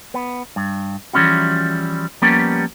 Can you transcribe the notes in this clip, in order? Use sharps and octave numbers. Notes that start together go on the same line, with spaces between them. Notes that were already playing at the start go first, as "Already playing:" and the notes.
B3
G2
E3 F3 G3 C#4 E4 F#4
F3 G3 A#3 B3 C#4 G4